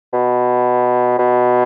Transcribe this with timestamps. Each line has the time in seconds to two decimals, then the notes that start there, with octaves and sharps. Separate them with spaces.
0.13 B2
1.19 B2